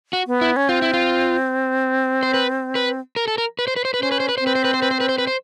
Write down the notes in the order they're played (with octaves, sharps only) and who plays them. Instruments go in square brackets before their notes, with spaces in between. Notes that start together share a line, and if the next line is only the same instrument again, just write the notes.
[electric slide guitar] F#4
[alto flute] B3
[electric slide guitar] E4
[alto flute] C#4
[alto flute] C4 [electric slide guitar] F4
[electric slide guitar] E4
F4
C5
B4
B4
A#4
A4
A#4
B4
C5
B4
C5
B4
[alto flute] C#4 [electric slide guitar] C5
[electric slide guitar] B4
C5
B4
[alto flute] C4 [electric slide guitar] C5
[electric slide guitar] B4
C5
B4
C5
B4
C5
B4
C5
B4
C5